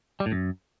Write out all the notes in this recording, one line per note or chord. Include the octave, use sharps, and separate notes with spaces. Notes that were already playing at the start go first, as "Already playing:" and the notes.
G3
A2
F#2